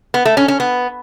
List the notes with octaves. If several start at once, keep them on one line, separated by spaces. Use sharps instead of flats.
B3
A3
C#4
C#4
B3